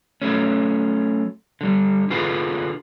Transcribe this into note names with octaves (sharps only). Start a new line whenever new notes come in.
F#3 A3 C#4
D3 G3
D3 F4 F#4 G#4 B4